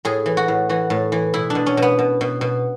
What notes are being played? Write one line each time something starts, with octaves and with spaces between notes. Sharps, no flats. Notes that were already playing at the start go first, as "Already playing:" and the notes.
A2 G#4
E3
F#4
A2
E3 F#4
A2
E3
B2 E4
D4
B2
C#4
B2
B3
B2
B2
B2